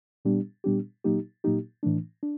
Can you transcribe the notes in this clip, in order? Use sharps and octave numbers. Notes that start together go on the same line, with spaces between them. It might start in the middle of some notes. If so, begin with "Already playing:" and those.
A#2 G3 B3 D4 G4
A#2 G3 B3 D4 G4
A#2 F#3 A#3 D#4 G4
A#2 F#3 A#3 D#4 G4
A2 E3 A3 D4
D4